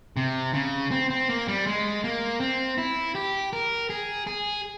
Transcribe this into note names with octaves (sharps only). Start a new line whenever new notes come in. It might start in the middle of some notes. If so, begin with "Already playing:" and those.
C3
C#3
C4
C4
A#3
G3
G#3
A#3
C4
E4
G4
A#4
G#4
G#4